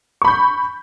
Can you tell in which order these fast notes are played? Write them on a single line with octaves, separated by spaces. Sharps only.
C#6 B5 G6